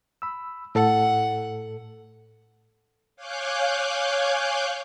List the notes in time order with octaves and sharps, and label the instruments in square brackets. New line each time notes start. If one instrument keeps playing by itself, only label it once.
[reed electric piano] B5 E6
[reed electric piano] A2 A4 [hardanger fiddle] F#5
[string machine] C#5 F5 G#5 D6 F#6 G6